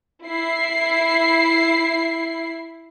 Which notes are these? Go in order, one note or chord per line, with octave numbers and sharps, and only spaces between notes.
E4 C7